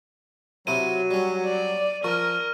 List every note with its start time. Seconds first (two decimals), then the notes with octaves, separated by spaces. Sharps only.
0.67 C3 F#3 E4 C5 D#7
1.11 G3 C#4
1.45 D5
2.04 F3 A#4 C#6 F6